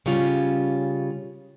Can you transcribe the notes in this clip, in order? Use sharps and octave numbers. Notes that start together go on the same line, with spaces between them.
C#3 G3 C#4 F4